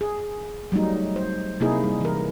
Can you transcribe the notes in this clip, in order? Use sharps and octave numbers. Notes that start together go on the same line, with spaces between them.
G#4
F#3 G3 A3 D#4
C5
C3 A#3 D#4 E4 G#4
G3
E3 A#4